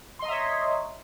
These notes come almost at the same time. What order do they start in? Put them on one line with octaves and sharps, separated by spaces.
C6 D#5 A#5 E5 C#5